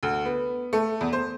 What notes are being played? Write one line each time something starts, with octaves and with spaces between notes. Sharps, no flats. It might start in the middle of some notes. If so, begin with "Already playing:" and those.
D2
B3
A3
E2
C5